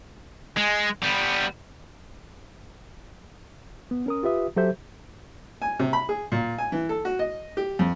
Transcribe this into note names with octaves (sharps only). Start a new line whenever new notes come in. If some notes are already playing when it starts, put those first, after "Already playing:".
G#3
G3 B3
B3
C#4 A#4 D#6
F4 G4 B4 E5 D#6
F#3 G4 A4 C5 E5 G6
G#5
C3
B5
G#4
A#2
G#5
E3
A4
F#4
D#5
G4
F2